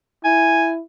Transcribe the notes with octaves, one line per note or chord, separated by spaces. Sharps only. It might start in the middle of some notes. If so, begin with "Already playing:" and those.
E4 G#5